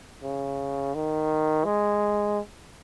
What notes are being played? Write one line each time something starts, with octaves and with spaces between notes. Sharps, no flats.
C#3
D#3
G#3